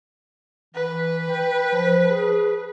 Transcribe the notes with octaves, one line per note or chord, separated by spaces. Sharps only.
E3 B4
G5
F3
G#4